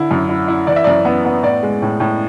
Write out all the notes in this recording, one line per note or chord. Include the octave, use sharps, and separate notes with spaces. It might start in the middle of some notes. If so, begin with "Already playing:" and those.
Already playing: D3 E4
F#2
E4
E4
E3 D5
E5
F#2 D5
B3
B3
A2 D5
G#3
A2
A2